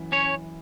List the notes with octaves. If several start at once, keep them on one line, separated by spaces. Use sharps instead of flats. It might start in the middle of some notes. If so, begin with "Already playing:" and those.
Already playing: F#2 E3
C#4 C#5